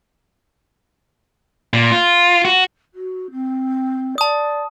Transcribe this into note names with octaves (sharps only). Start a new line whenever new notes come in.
A#2
F4
F#4
F#4
C4
D5 A5 D#6